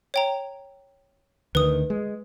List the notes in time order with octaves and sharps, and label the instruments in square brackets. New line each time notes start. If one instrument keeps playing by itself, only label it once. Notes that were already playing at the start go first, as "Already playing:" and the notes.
[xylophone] C#5 G5 A#5
[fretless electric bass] D2 D3 D#3 [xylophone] B4 D#6
[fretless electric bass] G#3